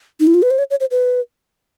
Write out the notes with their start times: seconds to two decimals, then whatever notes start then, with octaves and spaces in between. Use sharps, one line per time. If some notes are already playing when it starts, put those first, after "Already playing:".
0.20 D#4
0.27 E4
0.34 F4
0.42 B4
0.51 C5
0.58 C#5
0.70 C#5
0.80 C5
0.91 B4